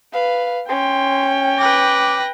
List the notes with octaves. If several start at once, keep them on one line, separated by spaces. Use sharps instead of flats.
B4 F5
C#4 G5 C6
B4 D6 A#6